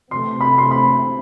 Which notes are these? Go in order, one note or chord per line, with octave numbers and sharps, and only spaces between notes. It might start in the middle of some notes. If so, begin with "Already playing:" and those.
C3 E3 A3 C4 C6
B5
C6
B5